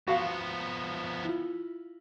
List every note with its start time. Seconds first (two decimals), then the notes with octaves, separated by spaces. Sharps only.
0.08 F3 B3 F#4 F5
1.25 E4 F4